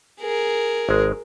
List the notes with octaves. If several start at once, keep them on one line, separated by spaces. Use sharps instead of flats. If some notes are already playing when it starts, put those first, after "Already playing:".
G#4 A#4
G#1 G#3